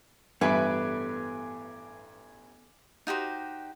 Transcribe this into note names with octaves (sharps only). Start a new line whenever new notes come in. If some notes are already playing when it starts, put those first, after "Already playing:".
A1 G2 B3 A4 B4 E5 G#5 D6
D#4 F#4 G4 C5